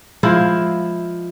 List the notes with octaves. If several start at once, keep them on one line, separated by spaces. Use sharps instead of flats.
F3 G#3 E4 F4